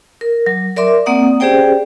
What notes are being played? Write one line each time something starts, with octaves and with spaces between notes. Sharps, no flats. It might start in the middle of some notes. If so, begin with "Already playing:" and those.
A#4
F#3
A#4 D5 E5 C6 D6
A#3 C4 D5 F#5 A#5 D#6
C#4 G4 G#4 C5 D5 G5